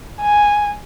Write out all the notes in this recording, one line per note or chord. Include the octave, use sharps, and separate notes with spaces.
G#5